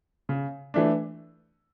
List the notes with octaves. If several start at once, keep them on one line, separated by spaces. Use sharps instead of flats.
C#3
E3 A3 D4